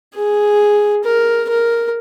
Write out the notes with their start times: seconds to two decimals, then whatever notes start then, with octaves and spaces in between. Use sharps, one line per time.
0.15 G#4
1.04 A#4
1.49 A#4